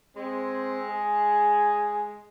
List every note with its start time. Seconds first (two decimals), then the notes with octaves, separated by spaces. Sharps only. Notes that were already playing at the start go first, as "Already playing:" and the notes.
0.17 G#3 C4
0.90 G#4